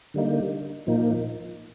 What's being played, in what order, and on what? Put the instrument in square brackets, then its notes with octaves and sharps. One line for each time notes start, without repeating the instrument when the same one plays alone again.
[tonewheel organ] D3 G3 A#3 D#4
A#2 F3 A#3 D#4